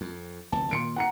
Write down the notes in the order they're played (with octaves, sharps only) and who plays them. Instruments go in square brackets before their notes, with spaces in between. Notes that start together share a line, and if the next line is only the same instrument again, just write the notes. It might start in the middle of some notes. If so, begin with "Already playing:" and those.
[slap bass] F2
[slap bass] F1 D2 [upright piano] A5
[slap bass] A#2 D#3 A#3 [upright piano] C6 C#7 D7
[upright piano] F#5 A#5 C#7